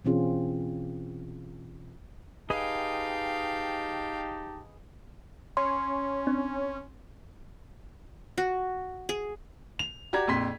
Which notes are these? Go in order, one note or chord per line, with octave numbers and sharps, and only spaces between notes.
B2 E3 C4 C#4 F4 G#4
D#4 G4 G#4 B4 D#5 F5 G5 A5
C#4 C6
C4 D4
F#4
G#4
F7
F#4 G4 D5 A#5 G#6
A#1 F2 C6 B6